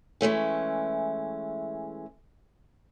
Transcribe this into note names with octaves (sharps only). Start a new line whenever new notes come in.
E3 G#3 A3 C#4